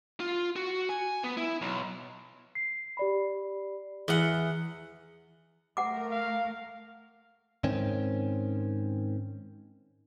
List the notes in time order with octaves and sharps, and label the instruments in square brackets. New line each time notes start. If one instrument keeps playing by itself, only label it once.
[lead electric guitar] F4
F#4
G#5
B3
E4
B1
[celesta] C7
G4 D5 B5
[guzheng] E2 F#5 [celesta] G#4 G7
[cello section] A3 A#4 [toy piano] F#5 D6
[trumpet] F5
[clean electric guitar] G#2 D#3 C4 C#4